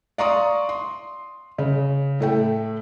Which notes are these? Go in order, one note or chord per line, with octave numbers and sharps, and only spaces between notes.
D5 F5 A#5 C6 C#6 D#6
C6
C#3
A2 A3 G5